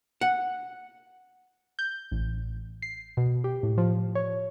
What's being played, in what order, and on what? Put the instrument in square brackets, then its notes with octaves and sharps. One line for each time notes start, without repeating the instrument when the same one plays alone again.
[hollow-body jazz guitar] F#5
[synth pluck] G6
A1
C7
B2
G4
A2
F3
C#5